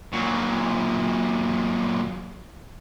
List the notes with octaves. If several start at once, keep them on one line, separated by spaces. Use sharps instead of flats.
A#2 F#3